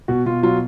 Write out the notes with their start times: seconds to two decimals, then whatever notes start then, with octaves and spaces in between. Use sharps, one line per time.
0.08 B2 F#4
0.26 B2 F4
0.43 F#3 F4